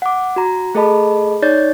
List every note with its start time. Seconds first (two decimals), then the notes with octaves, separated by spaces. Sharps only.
0.02 F#5 D6
0.36 F#4 A#5
0.75 A3 G#4 A4 D#5 A5 B5
1.42 D#4 C#5 D5 G6 A6